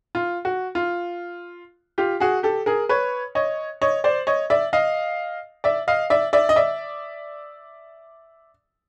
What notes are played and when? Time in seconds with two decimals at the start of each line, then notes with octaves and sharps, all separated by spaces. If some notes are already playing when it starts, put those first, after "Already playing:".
0.15 F4
0.45 F#4
0.75 F4
1.98 F4 G4
2.20 F#4 G#4
2.43 G4 A4
2.66 G#4 A#4
2.89 B4 C#5
3.35 C#5 D#5
3.81 C#5 D#5
4.04 C5 D5
4.27 C#5 D#5
4.50 D5 E5
4.73 D#5 F5
5.64 D5 E5
5.88 D#5 F5
6.10 D5 E5
6.33 D5 E5
6.49 D#5
6.56 D5 E5